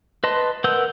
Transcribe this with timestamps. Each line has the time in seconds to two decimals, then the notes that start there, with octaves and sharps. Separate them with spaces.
0.24 B4 D#5 A5 C6
0.64 A#4 B4 F#5 E6 G6